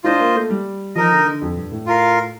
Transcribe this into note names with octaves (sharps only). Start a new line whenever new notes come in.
D4 F4 C5 D#5
A#3
A3
G3
F3 D#4 A#4 D#5
D3
D3
F2
G2
A2
F4 A#4 F5